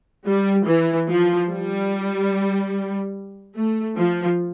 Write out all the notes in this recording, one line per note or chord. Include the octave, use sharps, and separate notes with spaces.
G3
E3
F3
G3
A3
F3